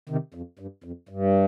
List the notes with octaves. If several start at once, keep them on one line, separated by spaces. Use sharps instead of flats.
C3 D#3
F2
G2
F2
G2